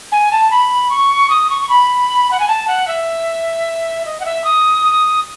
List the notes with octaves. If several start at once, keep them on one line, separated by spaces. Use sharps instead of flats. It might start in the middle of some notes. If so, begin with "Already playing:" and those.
G#5
A5
B5
C#6
D#6
C#6
C#6
B5
F#5
G#5
A5
F#5
E5
D#5
F#5
E5
D#6